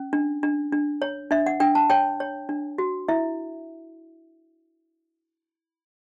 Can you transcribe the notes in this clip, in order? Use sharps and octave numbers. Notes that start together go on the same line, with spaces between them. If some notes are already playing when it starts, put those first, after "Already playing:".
Already playing: C#4
D4
D4
D4
C#5
D4 E5
F#5
D4 G5
A5
C#5 G5
C#5
D4
F#4
E4 E5